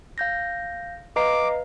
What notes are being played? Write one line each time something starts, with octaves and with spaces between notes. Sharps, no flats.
F5 G6 A#6
B4 D#5 F5 A#5 D6 C7